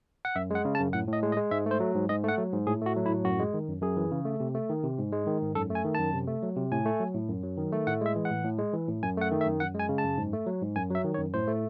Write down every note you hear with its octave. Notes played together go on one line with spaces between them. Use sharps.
F#5
F#2 E5
G#3 F#5
C#3
A5
F#2
A2 F#5
A2 D#5
G#3
D#5
G#3
G#2 E5
A3
C5
F#3
G#2
G#2 D#5
A3 F#5
F#3
G#2
A2 G#4
A3 F#4
F#3
E4
A2
F#2 F#4
G#3
D#3
F#2
F#2 G#4
E3
C#3
A3
C3
A3
D#3
C3
G#2
G#3
D#3
G#2
F#2 A4
A3
G#5
D#3
F#2 A5
C3
A3
F#3
C3
A2 G#5
A3
F#3
A2
F#2
F#3
D#3
A3
A2 F#5
G#3 E5
E3
F#5
A2
A2
G#3
E3
A2
F#2 G#5
A3 F#5
D#3
E5
F#2
F#2 F#5
G#3
G#5
C#3
A5
F#2
G#2
A3
F#3
G#2
F#2 G#5
F#3 E5
D#3
C#5
F#2
A2 C5
A3